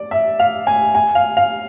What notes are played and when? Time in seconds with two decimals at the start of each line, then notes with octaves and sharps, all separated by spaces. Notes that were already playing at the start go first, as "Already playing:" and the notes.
Already playing: D5
0.11 E5
0.39 F5
0.67 G#5
0.95 G#5
1.15 F5
1.37 F5